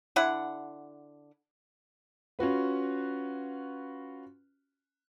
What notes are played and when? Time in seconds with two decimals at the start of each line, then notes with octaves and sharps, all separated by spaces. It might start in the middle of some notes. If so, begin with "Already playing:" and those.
0.16 D3 E4 F#5
2.39 C#4 F4 F#4 B4